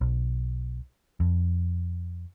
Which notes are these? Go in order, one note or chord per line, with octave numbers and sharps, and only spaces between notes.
B1
F2